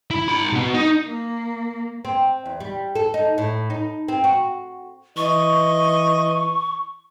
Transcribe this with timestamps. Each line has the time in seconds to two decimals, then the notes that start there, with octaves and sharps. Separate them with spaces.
0.11 E4
0.28 D#4 B5
0.53 B2 B3
0.74 D#4
1.06 A#3
2.05 C4
2.46 E2
2.60 G3
2.95 A4
3.14 D#4
3.38 A2
3.70 D#4
4.08 C4
4.24 F#4
5.17 E3 D#5 C#6